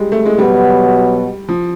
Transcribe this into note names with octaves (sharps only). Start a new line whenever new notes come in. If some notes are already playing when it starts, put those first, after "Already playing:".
Already playing: G3 G#3
A3
G#3
B2 F#3 G3 B3
F3